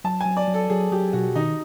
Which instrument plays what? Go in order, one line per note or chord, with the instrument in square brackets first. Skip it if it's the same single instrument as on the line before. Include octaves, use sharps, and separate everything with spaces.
[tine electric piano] F#3 [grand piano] A5
[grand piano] G#5
[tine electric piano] F#3
[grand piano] D5
[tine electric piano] F#3
[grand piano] A4
[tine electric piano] F#3 [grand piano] G#4
[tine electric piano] F#3 [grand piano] G4
[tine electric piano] B2 [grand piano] F#4
[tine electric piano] D#3 [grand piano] D#4